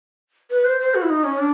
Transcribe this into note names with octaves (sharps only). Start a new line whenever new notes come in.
B4
C5
C5
F#4
E4
D#4
C#4
D4